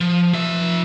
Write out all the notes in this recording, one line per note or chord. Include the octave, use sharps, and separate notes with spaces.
F3
F3 E5